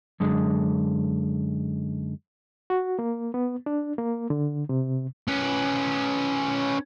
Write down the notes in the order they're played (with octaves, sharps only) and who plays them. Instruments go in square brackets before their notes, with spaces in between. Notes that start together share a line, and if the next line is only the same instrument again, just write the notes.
[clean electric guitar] F#2 D3 G#3
[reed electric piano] F#4
A#3
B3
D4
A#3
D3
C3
[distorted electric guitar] C#4 B4